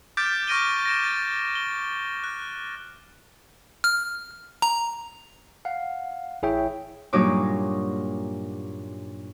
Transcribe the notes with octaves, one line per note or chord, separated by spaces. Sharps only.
D6 F6 G6 A6 B6 D7
C#6 F6 A#6 D7 D#7 G7
A#6 D7 E7
A6
G7
F#6
F6
A#5
F5 F#5
A1 E4 G#4 C#5 E5 G5
G2 A#2 F#3 D#4 C#5 D6